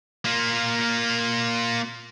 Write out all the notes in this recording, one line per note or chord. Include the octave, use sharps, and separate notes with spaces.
A#3 F4